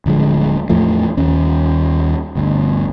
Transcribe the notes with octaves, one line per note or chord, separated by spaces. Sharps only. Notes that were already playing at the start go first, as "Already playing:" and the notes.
D1 D3 F3 G#3
E2 A2 F3 A3
D#2 C#4
G1 D2